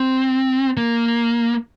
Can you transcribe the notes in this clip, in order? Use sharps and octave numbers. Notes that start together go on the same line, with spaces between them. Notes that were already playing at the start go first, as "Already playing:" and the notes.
Already playing: C4
A#3